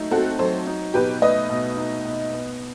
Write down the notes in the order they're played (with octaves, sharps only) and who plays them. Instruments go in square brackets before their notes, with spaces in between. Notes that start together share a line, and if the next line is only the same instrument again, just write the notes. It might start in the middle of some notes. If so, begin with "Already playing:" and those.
Already playing: [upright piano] F#3 A3 D#4
[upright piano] C4 [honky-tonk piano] F#4 A4
[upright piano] F#3 [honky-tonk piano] A4 C5
[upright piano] D#4
[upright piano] B2 [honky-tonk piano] G4 B4
[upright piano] A3 [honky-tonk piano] B4 D#5
[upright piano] B2
D#4
B2
B3